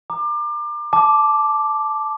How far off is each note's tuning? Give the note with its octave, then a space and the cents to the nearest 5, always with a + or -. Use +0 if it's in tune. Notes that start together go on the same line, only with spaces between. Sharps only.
A#5 +0 D6 +30
A5 -15 D6 +0